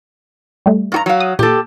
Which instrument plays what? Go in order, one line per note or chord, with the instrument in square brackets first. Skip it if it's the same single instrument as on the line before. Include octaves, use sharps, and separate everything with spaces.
[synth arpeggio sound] G3 A3
[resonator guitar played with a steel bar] G2 F#4 A#5
F#3 F5
[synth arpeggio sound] D#6
[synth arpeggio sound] A#2 [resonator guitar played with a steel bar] G4 A4